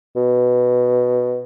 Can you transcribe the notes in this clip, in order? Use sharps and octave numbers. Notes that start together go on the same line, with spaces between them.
B2